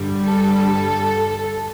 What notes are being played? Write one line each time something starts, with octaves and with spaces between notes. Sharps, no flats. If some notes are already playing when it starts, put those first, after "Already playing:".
Already playing: G2 D3 G3
A4